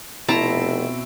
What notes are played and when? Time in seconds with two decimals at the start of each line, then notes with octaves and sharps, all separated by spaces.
0.29 F1 B2 C4 E4 A5 A#5